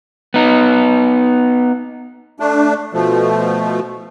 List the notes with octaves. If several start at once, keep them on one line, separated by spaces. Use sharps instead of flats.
B3 D#4
A3 D4
B2 F3 A3